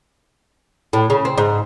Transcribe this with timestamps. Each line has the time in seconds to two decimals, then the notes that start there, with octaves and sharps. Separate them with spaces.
0.93 A2
1.10 C#3
1.25 C4
1.38 G#2